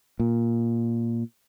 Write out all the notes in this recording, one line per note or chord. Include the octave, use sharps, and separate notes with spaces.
A#2